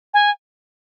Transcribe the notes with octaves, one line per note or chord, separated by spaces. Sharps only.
G#5